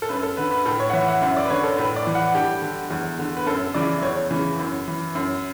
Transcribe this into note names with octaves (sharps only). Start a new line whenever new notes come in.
A4
F#2 B4
A4
D3 B4
B4
A2 A4
C#5
F#5
E3 E5
F#5
F#2 E5
D5
B4
D3 C#5
A4
A2 B4
D5
E3
F#5
G2 G4
D3
E2
D3
B4
F#2 A4
C#3 E3 D5
E2 C#5
C#3 E3
F#2
E3
F#2